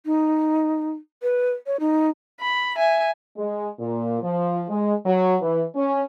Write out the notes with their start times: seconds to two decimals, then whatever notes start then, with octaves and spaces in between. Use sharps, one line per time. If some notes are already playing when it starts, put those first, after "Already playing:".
0.06 D#4
1.22 B4
1.66 C#5
1.80 D#4
2.41 B5
2.77 E5 G#5
3.37 G#3
3.79 A#2
4.22 F3
4.69 G#3
5.06 F#3
5.41 E3
5.75 C#4